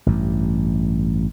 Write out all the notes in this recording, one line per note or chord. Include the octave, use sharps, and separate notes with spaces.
A1 G2